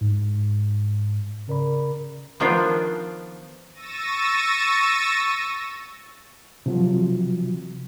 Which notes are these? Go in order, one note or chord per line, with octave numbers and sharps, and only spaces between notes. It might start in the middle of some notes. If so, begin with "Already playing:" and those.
G#2
C#3 A#4 D5 B5
D#3 F3 B3 D4 F4
C#6 E6 A6 A#6 D#7
C3 F3 F#3